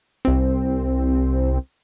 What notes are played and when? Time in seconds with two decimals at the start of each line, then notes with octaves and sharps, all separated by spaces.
0.25 C2 C4